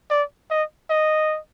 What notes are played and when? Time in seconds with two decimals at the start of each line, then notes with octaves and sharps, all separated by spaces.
0.10 D5
0.51 D#5
0.90 D#5